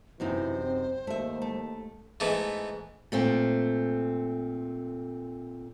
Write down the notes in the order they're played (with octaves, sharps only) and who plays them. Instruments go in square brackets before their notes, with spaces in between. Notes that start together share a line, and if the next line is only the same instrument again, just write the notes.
[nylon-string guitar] F#2 C3 D#4 [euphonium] E3 [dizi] C5
[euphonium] C4
[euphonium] D#2 [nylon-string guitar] A3 E5
[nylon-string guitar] A3
[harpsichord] G#2 E3 A3 B3
[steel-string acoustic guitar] A#2 A3 C4